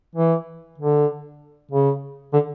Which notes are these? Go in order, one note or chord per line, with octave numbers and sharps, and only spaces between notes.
E3
D3
C#3
D3